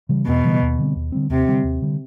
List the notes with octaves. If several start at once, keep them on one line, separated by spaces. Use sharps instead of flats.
C#3 E3 G3
E2 B2
C#3 E3 G3
D#2
D3 G3 C4
D#2
D3 G3 C4
D#2 C3
D3 G3 C4
D#2
D3 G3 C4